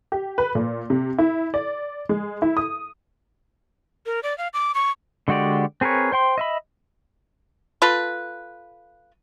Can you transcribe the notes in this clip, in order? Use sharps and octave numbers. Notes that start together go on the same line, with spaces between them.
G4
B4
A#2
C3
E4
D5
G#3
E4
D#6
A#4
D5
F5
D6
C#6
D3 G#3 F#4 G4 D5
C4 G#4 A#4 B4 C#5
C5 G5 C6
D#5 E5 B5
F4 A4 B4